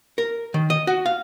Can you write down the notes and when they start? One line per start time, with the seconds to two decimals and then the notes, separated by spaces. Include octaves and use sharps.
0.18 A#4
0.54 D#3
0.70 D#5
0.87 F#4
1.06 F5